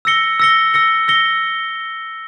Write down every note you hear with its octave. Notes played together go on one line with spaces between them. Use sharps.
E6 A#6 C#7 G7
E6 A#6 C#7 G7
E6 A#6 C#7 G7
E6 A#6 C#7 G7